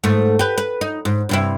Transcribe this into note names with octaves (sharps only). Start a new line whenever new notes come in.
G#2 A3
G4 B4
B4
D#4
G#2
G2 C3 E4